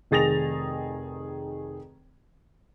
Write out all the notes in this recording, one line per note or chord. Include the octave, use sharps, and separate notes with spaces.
F1 D#3 G#4 A6 A#6 F7